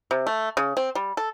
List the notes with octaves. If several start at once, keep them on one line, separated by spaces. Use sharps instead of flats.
C3
A3
C#3
C4
G3
A4